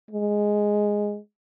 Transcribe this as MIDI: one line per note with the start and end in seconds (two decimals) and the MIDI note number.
0.11 1.18 56